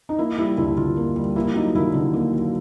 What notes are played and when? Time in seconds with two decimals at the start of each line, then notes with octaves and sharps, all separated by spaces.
0.09 D#4
0.19 A#3 E4
0.38 G3 E4
0.57 D2 E4
0.77 D3 F4
0.97 A#3
1.16 G3
1.36 A#3 E4
1.55 F#3 D#4
1.75 D#2 E4
1.94 D3 E4
2.14 A#3
2.33 F#3